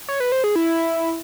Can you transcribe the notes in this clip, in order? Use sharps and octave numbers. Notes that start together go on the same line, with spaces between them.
C#5
B4
C5
G#4
E4